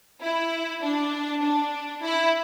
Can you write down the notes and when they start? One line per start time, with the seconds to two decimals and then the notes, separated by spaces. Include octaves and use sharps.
0.22 E4
0.82 D4
1.43 D4
2.02 E4